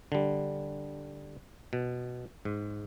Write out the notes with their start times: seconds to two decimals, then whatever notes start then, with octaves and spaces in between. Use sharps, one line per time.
0.12 D3 G3
1.73 B2
2.45 G#2